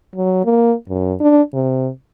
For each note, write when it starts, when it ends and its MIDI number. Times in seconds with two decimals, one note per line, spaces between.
0.16 0.41 54
0.45 0.74 58
0.89 1.13 42
1.21 1.41 62
1.54 1.90 48